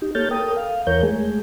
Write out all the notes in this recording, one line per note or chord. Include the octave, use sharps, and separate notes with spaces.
D#4 G4
A#3 A4 C#5 F6 G6 A6
A4 A#4 G5 D#6
F5
E2 E3 A#4 C#5 G6
G#3 A3 G#4